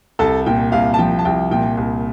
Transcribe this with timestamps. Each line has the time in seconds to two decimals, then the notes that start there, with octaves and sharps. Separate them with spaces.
0.19 C2 A4 A5
0.46 A#2 G5
0.72 C2 F5
0.94 A5
0.99 F3 G5
1.19 A5
1.25 C2 G5
1.51 A#2 G5
1.77 C2